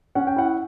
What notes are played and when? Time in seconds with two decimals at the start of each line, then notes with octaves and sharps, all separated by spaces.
0.15 C#4 F#5
0.27 G5
0.36 E4 F#5